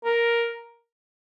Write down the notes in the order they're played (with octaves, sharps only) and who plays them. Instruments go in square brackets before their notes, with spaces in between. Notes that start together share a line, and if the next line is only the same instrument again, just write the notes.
[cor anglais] A#4